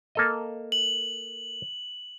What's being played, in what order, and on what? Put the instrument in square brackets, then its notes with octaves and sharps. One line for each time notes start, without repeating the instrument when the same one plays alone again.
[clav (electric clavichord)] A#3 A4 D#5
[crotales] F#7